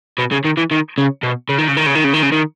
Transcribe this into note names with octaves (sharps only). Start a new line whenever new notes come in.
B2
C#3
D#3
E3
D#3
C#3
B2
C#3
D#3
C#3
D#3
C#3
D#3
C#3
D#3
C#3
D#3